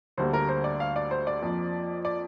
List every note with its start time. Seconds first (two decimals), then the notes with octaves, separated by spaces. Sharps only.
0.18 D2 D3 G3 A#3 C5
0.33 A#4
0.49 C5
0.64 D5
0.80 F5
0.96 D5
1.11 C5
1.27 D5
1.42 F2 F3 A#3
2.05 D5